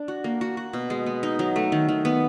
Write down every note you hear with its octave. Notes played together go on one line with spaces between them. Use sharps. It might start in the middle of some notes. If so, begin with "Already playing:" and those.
Already playing: D4
F#4
A#3
F#4
F#4
B2
G#3
B3
D#4
F#3
A3
D#3
D#3
B3